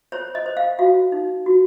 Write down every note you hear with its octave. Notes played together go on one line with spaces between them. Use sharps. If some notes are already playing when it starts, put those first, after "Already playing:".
C5 C#5
D#5
C5
F5
F#4 F5
D#4
F#4